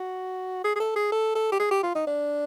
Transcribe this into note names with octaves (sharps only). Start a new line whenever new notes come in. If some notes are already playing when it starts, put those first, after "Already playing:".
Already playing: F#4
G#4
G#4
A4
G#4
A4
A4
G4
G#4
G4
F4
D#4
D4